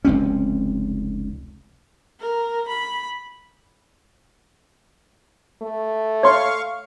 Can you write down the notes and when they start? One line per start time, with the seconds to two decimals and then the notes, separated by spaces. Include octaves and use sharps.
0.05 F1 C#2 C4 C#4
2.20 A#4
2.68 B5
5.62 A3
6.23 C#5 F5 C6 C#6